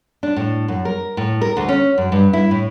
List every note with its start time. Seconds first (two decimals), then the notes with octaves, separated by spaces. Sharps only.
0.23 D4
0.36 A2
0.68 F#2
0.85 A#4
1.17 A2
1.42 A#4
1.57 D2
1.69 C#4
1.98 F#2
2.12 G2
2.33 E4
2.51 A2